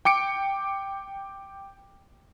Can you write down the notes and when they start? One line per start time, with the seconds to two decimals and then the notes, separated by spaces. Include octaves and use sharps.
0.05 G5 D6 C#7 D7